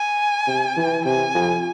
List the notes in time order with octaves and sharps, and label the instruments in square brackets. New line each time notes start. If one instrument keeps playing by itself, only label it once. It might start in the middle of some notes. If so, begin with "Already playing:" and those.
Already playing: [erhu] G#5
[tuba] C3
E3
[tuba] C3 [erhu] G#5
[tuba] F2